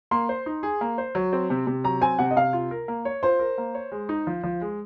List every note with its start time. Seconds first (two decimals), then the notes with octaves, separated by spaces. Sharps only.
0.11 A#3 C6
0.29 C5
0.46 D#4
0.63 G#4
0.81 A#3
0.98 C5
1.15 F#3
1.33 C4
1.50 C3
1.67 C3
1.84 F#3 A#5
2.01 C4 G#5
2.19 C3 F#5
2.31 D#5
2.36 C3 F5
2.53 F4
2.71 A#4
2.88 A#3
3.05 C#5
3.23 F4 C5
3.39 A#4
3.58 A#3
3.75 C#5
3.92 G#3
4.09 D#4
4.27 F3
4.44 F3
4.61 G#3